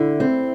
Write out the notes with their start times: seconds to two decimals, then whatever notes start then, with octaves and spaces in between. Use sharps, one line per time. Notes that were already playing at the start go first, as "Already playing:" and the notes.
Already playing: D3 E4
0.20 C4